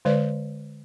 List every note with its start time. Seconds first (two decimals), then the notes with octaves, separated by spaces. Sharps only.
0.05 D3 G#3 B4 D5